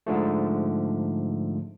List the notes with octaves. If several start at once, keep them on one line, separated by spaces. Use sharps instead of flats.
G#2 D3 F3 A3